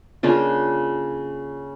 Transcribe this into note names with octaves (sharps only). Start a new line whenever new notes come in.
C#3 A#3 D4 F4